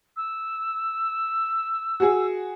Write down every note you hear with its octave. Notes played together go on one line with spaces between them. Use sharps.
E6
F#4 G#4